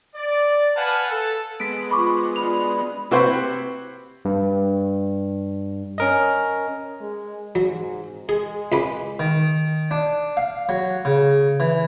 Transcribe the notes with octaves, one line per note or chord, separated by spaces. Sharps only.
D5
B4 F5 F#5 G#5 A5
A4
G#3 B3 B6 D7
F3 B5 C#6 D6
D4 F4 F#4 B5 F7
C3 E4 F#4 B4 C5
G2
C#4 A#4 D#5
G#3
G#2 F#3
G#3 G#4
C#2 B4 D6
D#3
D4
F5
F#3
C#3
E3